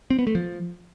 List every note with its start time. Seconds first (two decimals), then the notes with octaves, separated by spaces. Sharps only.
0.10 C4
0.19 B3
0.27 A3
0.35 F3